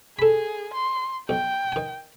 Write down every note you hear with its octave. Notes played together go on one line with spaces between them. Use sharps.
G#4 A4 B5
C6
B1 G5
D#3 G#5